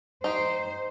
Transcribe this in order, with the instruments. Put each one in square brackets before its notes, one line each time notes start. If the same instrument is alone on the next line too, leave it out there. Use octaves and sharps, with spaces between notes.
[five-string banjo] D#4 G4 [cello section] C5